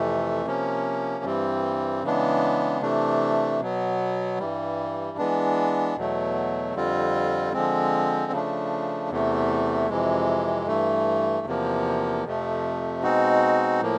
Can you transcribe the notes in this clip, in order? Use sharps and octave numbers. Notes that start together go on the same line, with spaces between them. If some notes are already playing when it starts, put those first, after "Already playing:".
Already playing: F2 C3 E3 A3
C3 F3 A#3 C#4
G2 E3 G3 C4
C#3 E3 G#3 B3 D4
C3 E3 A3 D4
B2 F#3 B3
G2 E3 G3
E3 G#3 B3 D4
E2 B2 F#3 A3
F2 D3 G3 C4 F4
D3 F3 G#3 C4
C#3 F3 A3 D4
E2 C3 E3 A3
F2 C3 E3 G#3
G2 E3 A3
E2 C3 F3 A#3
F2 C3 F3 A3
B2 G#3 C4 D#4 F#4
A2 F3 A#3